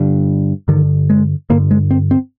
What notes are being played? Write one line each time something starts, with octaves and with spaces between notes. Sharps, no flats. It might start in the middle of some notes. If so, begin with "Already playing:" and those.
Already playing: G2 D3
G2 D3 D#3
G#3
G2 D3 A#3
G#3
C4
C4